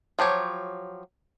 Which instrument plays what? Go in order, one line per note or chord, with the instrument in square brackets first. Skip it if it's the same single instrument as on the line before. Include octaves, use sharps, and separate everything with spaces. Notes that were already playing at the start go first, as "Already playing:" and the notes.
[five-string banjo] F3 F#3 G4 C#5